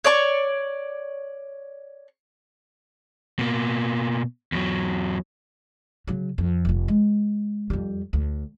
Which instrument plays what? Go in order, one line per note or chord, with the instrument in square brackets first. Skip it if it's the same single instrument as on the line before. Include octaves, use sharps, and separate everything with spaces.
[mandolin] C#5 D5 C#6
[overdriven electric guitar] B2 A#3
E2 F#3
[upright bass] C#3 F#3
F2
F1 F4
G#3
F2 G3
D2